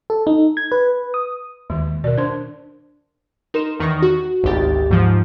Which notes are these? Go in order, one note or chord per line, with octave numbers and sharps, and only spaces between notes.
A4
D#4
G#6
B4
D#6
D#2 D#3 G#3
B2 A#4 D5
D4 C5 C6
D#4 A#4 C6 E7
E2 D#3 D#4 C#6 A#6
F#4
G#1 D2 G4 A6
G#2 F3